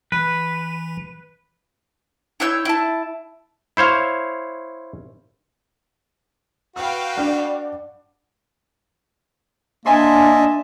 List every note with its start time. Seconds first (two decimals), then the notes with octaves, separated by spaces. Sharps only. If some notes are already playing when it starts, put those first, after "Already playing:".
0.12 E3 B4
2.40 E4 C#5 E6 G6
2.65 E4 A5
3.77 E4 C5 C#5 F5
6.76 F#4 B4 F5 G5 E6
7.17 D4 D5 F#5
9.86 A#3 D4 D#5 E5 G#5 A5 B5 C6